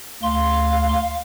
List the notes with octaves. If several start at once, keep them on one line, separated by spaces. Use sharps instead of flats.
D2 F5 C6